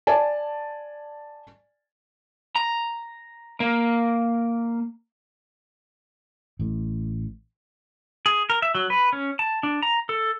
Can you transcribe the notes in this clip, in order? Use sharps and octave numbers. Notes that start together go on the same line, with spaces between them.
D5 G#5 A5
A#5
A#3
A1 A2
G#4
A#4
E5
F#3
B4
C#4
A5
D4
A#5
A4